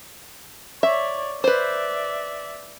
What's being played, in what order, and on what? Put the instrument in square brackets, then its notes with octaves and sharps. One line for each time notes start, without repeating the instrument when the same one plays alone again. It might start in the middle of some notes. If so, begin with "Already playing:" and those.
[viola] C#5 D5 [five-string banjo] E5
[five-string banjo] B4 C5 [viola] D5 E5